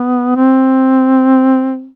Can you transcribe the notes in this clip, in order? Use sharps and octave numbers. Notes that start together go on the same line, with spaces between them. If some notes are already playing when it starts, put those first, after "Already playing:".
Already playing: B3
C4